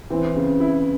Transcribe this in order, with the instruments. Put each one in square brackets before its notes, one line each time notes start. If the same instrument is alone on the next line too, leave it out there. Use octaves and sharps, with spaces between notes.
[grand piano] E3 [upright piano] C4
[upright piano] C#3
E4